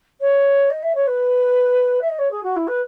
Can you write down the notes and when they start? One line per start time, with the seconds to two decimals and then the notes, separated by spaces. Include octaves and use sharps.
0.20 C#5
0.69 D#5
0.82 E5
0.95 C#5
1.07 B4
2.01 E5
2.08 D#5
2.18 C#5
2.30 G#4
2.43 F#4
2.56 E4
2.67 B4